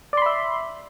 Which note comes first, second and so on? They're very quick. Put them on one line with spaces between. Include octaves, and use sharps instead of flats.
D5 C6 B5 E5